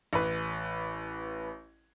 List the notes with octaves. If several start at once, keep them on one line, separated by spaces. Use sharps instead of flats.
A1 B4